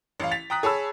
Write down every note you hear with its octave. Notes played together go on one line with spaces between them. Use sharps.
A1 F5
A6 B6 F7
G5 A#5 D#6 F#6 B6
G#4 C#5 A5 B5 E6